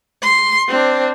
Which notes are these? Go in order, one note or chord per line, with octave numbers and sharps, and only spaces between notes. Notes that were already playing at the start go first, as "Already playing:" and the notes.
C6
C4 D4